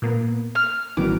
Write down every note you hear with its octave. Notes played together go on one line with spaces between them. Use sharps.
A#2 A#3 B3
F6
A1 D#3 E3 F#3 G3 B3 D6